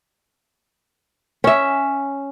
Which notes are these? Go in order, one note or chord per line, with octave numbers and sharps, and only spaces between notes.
C#4 E5